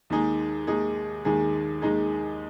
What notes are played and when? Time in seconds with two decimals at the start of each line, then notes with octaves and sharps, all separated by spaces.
0.10 D#2 D#3 G#3 D#4 G#4
0.67 D#2 D#3 G#3 D#4 G#4
1.25 D#2 D#3 G#3 D#4 G#4
1.82 D#2 D#3 G#3 D#4 G#4